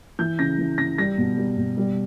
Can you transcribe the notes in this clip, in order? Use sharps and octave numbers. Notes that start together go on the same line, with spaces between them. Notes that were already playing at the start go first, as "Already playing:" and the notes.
E3 G6
C#3 A#6
E3
C#3 A#6
G3 A#6
B2
G3
B2
G3